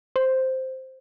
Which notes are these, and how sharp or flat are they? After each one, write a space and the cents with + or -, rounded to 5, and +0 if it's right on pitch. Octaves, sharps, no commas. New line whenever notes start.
C5 +0